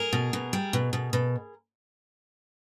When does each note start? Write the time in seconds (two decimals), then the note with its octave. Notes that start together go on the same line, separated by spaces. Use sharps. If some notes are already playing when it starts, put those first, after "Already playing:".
Already playing: G#4 A#4
0.13 B2
0.33 B2
0.53 G3
0.73 B2
0.93 B2
1.13 B2